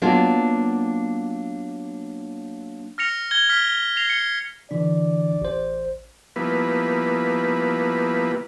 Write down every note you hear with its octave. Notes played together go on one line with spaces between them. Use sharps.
F#3 A#3 B3 D4 F4
F6 A#6 C#7 F7
G#6 G7
F6 B6
A#6 C7 F7
C#7
D3 E3 D4 D5
A1 C5
F3 G3 A#3 B3 E4 B4